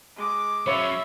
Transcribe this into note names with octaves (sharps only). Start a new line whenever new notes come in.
G#3 D6
F#3 C#4 C#5 E5 B5 A6